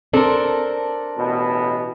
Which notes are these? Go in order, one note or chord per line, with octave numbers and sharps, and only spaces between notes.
C4 D4 A4 A#4
A1 B2